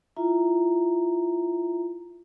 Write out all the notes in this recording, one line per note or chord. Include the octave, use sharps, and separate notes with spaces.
E4 F4 E5 A#5